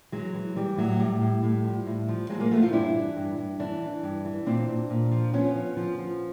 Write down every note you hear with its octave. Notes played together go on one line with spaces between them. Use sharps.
E3 F#3 G#3
E3
E3 G3
A2 F#3
A2 G3
A2
A2
F3
A2
F3
F3 F#3 G#3
G#3 A#3
F3 A3 B3
D#4 F4
G2 D4 E4
E3
G2
G2
E3 D4 E4
E3
G2
E3
A#2 C4 D4
A#2
A#2
F3
F3 B3 C#4
F3
F3
F3